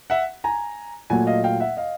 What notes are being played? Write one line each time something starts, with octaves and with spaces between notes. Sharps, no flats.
E5 F#5
G#5 A#5
A#2 F#3 A3 F#5 G#5
D#5 F5
F5 G5
E5 F#5
D#5 F5